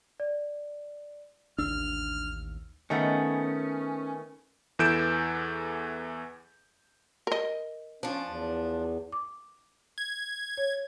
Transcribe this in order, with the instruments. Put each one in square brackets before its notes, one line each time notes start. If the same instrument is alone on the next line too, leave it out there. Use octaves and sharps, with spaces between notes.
[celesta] D5
[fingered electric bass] A1 D#2 D#3 [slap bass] D4 [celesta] E6 [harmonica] F6
[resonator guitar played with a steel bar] D#3 A3 B3 [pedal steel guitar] C#4
[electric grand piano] E2 E3 A4 G6 D7 E7
[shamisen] A#4 D#5
[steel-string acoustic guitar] F3 D4 [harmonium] C#4
[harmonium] E2
[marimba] D6
[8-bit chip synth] G#6
[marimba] C#5